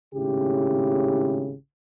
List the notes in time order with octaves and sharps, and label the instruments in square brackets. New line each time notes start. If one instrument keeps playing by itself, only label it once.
[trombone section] G#1 A2 C#3 C#4 E4 G4